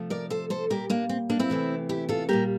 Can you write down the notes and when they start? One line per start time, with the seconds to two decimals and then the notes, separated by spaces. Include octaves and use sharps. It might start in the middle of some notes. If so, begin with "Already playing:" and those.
Already playing: C3 F3 A3
0.10 A#4 D5
0.30 A4 C5
0.50 A4 C5
0.70 A#2 G3 A#3 G4 A#4
0.90 A#3 D4
1.09 C4
1.30 A#3 D4
1.39 C4 E4
1.50 E2 C3 E3 A3
1.89 E4 G4
2.09 F4 A4
2.29 A#2 G3 A#3 G4 A#4